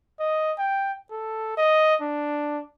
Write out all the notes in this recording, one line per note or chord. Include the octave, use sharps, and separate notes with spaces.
D#5
G5
A4
D#5
D4